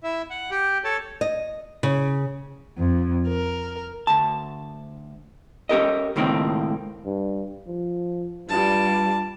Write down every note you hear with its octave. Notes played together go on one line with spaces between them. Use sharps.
E4 E5
F#5
G4 G5
A4 C#5 A5
D#5
C#3
F2
A#4
D2 A5
C#4 G4 A#4 D#5
C#2 A2 D#3 A#3 C4
G2
F3
G2 G3 F4 A5